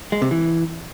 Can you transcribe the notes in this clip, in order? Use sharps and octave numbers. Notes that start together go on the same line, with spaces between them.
G#3
C3
E3